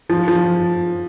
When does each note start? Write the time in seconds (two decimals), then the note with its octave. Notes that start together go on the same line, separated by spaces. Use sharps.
0.09 F3
0.28 F3